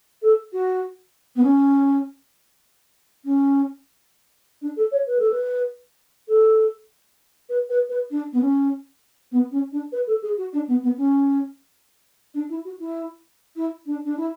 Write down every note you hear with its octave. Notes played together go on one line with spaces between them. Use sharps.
A4
F#4
B3
C#4
C#4
D4
A4
C#5
B4
A4
B4
A4
B4
B4
B4
D4
B3
C#4
B3
C#4
D4
B4
A4
G#4
F#4
D4
B3
B3
C#4
D4
E4
F#4
E4
E4
D4
D4
E4